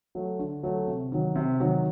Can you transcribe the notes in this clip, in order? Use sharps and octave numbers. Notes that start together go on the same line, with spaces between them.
F#3 A3
D3
F#3 A3
C3
D#3 F#3
C3
D#3 F#3